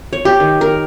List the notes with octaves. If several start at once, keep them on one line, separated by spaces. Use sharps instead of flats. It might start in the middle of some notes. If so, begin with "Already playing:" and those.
C#5
G4
D#3
A#4